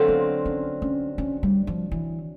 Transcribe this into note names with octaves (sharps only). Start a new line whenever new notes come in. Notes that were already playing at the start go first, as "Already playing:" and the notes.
Already playing: D3 F#3 A3 C4 F4
B3
C#4
C#4
C#4
G3
F3
E3